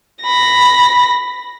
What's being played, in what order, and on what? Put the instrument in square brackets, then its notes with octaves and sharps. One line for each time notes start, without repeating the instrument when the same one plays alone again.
[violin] B5 A#6